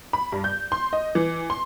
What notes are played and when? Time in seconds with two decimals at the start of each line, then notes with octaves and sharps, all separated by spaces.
0.13 B5
0.32 G2
0.44 G6
0.72 C6
0.93 D#5
1.15 E3
1.50 C6